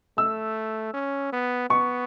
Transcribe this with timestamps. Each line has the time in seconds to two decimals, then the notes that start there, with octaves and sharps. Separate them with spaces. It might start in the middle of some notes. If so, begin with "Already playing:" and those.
0.17 A3 E6
0.94 C#4
1.33 B3
1.70 B3 C#6